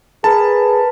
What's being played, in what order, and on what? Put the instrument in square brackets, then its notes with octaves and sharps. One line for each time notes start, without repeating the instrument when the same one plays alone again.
[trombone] G#4 [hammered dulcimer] A#4 B4 [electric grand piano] A5